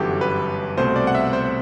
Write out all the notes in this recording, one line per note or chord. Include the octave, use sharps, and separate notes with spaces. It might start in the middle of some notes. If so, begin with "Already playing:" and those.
Already playing: G1 F#2 E3 F#4 G4 A4
B4
C2 B2 A3 C4 C5
D5
F#5
E5
C5